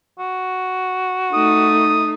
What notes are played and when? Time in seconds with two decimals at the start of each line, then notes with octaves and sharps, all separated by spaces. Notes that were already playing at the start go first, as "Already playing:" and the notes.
0.19 F#4
1.33 A3 D#4 D#6